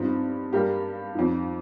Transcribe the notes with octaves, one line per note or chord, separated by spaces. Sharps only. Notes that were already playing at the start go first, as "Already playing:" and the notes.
Already playing: G2 F3 C4 D#4
G2 G3 A#3 G4
F2 F3 D#4